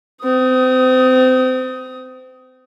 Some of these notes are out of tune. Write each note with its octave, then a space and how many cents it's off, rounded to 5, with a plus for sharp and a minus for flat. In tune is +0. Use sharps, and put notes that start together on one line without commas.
C4 -30 D#6 +15